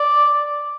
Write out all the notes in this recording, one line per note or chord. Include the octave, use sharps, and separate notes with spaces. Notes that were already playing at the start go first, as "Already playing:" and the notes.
Already playing: D5